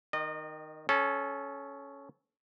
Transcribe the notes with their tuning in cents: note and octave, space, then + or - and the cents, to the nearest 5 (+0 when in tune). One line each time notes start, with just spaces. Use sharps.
D#3 +0 D#5 -35
C#4 +0 A4 -25